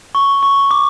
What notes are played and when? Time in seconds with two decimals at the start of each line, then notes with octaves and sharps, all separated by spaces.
0.15 C#6
0.43 C#6
0.71 D6